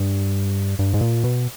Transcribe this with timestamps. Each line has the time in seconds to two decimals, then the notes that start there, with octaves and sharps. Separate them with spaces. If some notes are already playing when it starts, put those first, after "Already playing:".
Already playing: G2
0.79 G2
0.94 G#2
1.01 A#2
1.24 B2